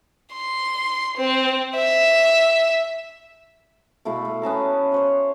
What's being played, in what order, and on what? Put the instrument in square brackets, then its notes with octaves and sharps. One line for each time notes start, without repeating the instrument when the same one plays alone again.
[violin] C6
C4
E5
[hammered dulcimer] B2 A3 E4 F5
A3
B3 C#4 A5 A#5
C5 C#5 F#5